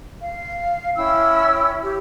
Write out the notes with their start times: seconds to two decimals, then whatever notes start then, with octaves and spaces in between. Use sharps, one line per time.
0.20 F5
0.96 C#4 E4 G5 E6
1.81 G4